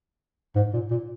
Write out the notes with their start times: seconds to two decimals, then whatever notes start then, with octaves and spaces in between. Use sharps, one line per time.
0.56 G#2
0.73 A#2
0.91 A#2